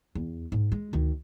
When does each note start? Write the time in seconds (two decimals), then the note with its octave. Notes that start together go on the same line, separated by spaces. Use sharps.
0.15 E2
0.52 G#2
0.72 G#3
0.93 D2 D#3